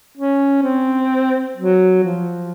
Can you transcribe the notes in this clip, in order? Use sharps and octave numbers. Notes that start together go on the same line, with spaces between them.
C#4
C4
F#3
F3